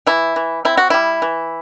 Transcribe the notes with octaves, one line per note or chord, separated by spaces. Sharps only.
E3 E4
E3
C4 E4
F#4
G3 E4
E3